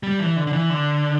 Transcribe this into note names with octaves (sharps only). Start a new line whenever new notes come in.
G3
E3
D3
D3
E3
D3